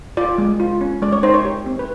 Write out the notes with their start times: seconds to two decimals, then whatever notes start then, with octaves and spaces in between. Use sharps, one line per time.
0.17 F4 D5
0.38 G#3
0.60 F4
0.81 C#4
1.02 G#3 D5
1.12 C#5
1.23 D#4 C5
1.34 C#5
1.45 G4
1.66 C4
1.79 B4